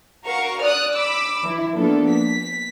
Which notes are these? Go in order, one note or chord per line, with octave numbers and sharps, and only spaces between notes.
F#4 A#4 F5 C#6
D5 D#6 F6 F#6
B5 D6 E6
E3 E4
F3 A#3 B3 D4 A4
B6